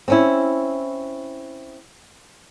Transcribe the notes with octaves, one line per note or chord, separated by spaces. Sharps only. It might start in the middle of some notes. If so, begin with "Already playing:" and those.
C4 C#4 E4